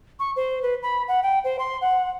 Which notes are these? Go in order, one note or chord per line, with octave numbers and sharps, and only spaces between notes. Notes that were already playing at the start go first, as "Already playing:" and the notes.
C#6
C5
B4
B5
F#5
G5
C5
C6
F#5